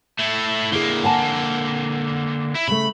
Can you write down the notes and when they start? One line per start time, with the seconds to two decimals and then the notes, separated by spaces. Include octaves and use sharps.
0.19 A3 E4
0.72 D3 A#3 E4 G#4
1.04 F#5 G#5 A5
2.55 E4
2.68 C#3 A3 B5